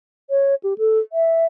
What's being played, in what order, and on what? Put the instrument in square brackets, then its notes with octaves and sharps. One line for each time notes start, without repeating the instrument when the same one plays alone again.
[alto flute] C#5
G4
A4
E5